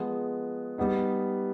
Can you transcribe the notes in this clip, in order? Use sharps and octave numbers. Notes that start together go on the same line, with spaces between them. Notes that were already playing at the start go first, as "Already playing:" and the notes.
Already playing: F3 G#3 B3
G3 B3 D#4